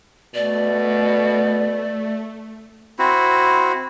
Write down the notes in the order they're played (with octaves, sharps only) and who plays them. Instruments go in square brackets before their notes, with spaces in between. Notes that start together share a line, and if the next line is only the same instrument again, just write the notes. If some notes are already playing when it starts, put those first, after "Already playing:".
[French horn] B2 [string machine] A3 [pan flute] D5
[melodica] C4 E4 F#4